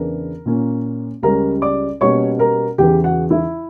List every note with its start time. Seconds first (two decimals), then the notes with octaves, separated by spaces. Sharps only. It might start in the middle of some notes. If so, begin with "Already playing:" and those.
Already playing: E2 C#3 E3 B3 D4 A#4
0.46 A#2 A#3 C#4
1.23 C#2 C#3 G3 C#4 A#4 A#5
1.62 D5 D6
2.01 B2 G3 A#3 C#4 C#5 C#6
2.39 A#4 A#5
2.78 E2 C#3 E3 G4 G5
3.04 F#4 F#5
3.30 E4 E5